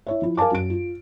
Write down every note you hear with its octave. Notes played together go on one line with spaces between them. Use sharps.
E4 C#5 E5
F3 E4
A#4 F5 G#5 A5 D6
F#2 D7
F4